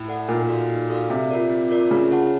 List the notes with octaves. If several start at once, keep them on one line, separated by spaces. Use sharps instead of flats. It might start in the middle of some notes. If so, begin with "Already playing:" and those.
Already playing: A2
A4 D5 F#5
A#2 D#4
F#4 A4 D5 F5
D#4
F#4 A4 D5 F5
C3 C4
F4 A#4 D5
C4
F4 A#4 D5
C#3 F4
G#4 C#5 F#5 A5